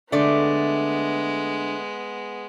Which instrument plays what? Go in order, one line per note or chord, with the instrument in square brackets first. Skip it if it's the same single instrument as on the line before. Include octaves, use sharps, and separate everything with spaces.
[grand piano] D3 [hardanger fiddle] G#3 B3 [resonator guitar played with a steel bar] A3 D5